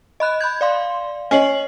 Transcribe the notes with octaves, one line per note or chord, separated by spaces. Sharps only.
D#5 B5 F#6
B5 G6 G#6
D5 F5 C6
C#4 D#5 C7 F#7